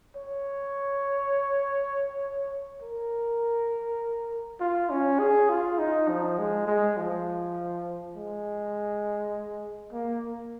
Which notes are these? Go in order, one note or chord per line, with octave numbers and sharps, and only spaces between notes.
C#5
A#4
F4
C#4
G#4
F4
D#4
F3
G#3
G#3
F3
G#3
A#3